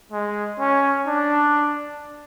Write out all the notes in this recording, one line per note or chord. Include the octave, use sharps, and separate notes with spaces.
G#3
C#4
D4